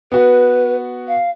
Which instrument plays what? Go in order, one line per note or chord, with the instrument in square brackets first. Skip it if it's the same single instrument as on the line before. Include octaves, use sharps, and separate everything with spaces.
[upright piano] B3 F#4 [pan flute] B4
[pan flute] F5